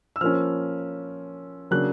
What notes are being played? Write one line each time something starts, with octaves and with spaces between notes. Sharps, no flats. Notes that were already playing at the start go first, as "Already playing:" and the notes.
E6
F3 A#3 C#4 F6
C#3 F#3 A#3 D4 F#6